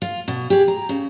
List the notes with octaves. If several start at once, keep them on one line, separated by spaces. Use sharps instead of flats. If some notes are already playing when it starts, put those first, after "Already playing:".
F4
B2
G4 G#4
A#5
C#3